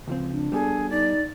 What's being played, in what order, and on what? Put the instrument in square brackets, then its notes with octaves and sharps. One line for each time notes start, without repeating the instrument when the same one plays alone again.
[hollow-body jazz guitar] C#2 F3 C4
[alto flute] D4
[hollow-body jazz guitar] G3 B3 A4 [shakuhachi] G#4
[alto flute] D#4 [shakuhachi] D5